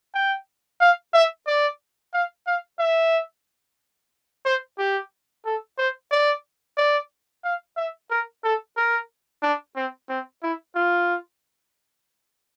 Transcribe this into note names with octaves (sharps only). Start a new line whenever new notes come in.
G5
F5
E5
D5
F5
F5
E5
C5
G4
A4
C5
D5
D5
F5
E5
A#4
A4
A#4
D4
C4
C4
E4
F4